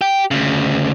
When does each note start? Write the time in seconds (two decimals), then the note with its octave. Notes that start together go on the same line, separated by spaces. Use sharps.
0.01 G4
0.31 D2 C#3